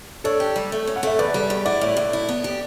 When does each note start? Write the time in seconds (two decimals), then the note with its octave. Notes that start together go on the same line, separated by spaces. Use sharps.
0.24 D4 A4 C#5
0.40 G4
0.56 G3
0.72 A3
0.87 C#4
0.96 F#5
1.03 A3 E5
1.19 E2 B4 D5
1.34 G3
1.50 E2
1.65 E4 D5 F#5
1.81 A2
1.97 A2
2.13 E4
2.29 B3
2.44 G4